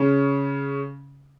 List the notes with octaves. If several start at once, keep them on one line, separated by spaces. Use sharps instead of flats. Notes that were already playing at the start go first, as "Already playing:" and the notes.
Already playing: C#3 C#4